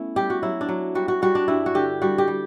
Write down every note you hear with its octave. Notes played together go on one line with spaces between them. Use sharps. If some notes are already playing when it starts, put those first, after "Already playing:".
Already playing: A3 B3 C#4 E4
G3 G4
F#4
F#3 E4
D4
F#3
G3 F#4
F#4
G3 F#4
D4
G2 E4
F#4
D3 G4
G3 F#4
G4
G3